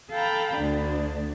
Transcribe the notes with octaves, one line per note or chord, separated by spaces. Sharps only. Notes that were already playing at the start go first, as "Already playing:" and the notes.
A4 F5 G5 A#5 B5
D2 D4